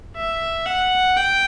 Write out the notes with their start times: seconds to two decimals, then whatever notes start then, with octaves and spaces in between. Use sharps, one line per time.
0.16 E5
0.66 F#5
1.16 G5